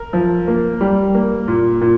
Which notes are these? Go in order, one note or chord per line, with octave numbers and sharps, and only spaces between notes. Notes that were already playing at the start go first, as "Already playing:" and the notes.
Already playing: A#4
F3
A#3
G3
A#3
A#2
A#2